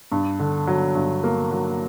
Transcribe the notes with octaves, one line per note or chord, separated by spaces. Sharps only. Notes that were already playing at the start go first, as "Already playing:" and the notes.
G2
D3
F#3
G2
A#3
F#3